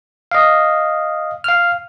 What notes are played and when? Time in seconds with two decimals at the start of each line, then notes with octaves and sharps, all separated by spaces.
0.32 D#5 F5
1.44 F5 F6